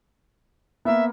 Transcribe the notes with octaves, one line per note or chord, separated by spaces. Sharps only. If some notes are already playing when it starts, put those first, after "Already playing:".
A#3 B3 E5